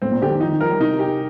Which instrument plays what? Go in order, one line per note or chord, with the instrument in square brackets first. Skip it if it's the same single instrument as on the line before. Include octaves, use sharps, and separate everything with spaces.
[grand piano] A2 [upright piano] C4
[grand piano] A#2
[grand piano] D3 [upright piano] G4
[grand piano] D#3
[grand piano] F3 [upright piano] D#4
[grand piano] D#3
[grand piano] F3 [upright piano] A#4
[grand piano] G3
[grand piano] C3 [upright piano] D#4
[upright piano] G4